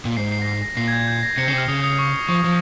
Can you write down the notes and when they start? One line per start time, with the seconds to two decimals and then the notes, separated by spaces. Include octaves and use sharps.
0.05 A#2
0.17 G#2 C7
0.32 C7
0.42 A#6
0.48 C7
0.62 A#6
0.77 A#2 C7
0.88 G#6
0.92 G6
1.08 G6
1.23 A#6
1.38 C3 C#7
1.48 C#3 C7
1.53 C3 F6
1.68 C#3 D#6
1.84 D#6
1.99 C#6
2.28 F3 C#6
2.44 F3